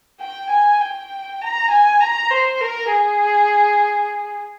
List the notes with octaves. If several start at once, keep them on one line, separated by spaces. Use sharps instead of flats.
G5
G#5
G5
A#5
G#5
A#5
C5
A#4
G#4